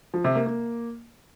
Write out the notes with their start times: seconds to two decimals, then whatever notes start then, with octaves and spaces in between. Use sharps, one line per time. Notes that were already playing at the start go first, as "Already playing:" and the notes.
0.14 F3
0.24 C3
0.35 A#3
0.46 A#3